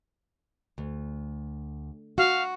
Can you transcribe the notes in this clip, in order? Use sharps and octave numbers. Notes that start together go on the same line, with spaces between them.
D2
F#4 F5